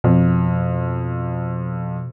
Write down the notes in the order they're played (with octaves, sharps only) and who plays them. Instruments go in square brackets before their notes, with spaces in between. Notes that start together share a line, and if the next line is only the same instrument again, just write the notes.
[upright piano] F2 [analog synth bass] B2